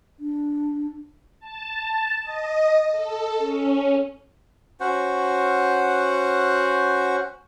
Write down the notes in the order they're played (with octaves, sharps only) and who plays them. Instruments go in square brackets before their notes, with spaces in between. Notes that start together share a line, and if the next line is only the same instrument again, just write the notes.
[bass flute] D4
[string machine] A5
D#5
A4
C#4
[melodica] C#4 F#4 C5 F#5